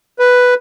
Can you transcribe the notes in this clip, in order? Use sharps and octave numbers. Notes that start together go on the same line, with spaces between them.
B4